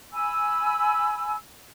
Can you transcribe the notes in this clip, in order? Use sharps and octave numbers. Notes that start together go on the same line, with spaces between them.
G#5 B5 E6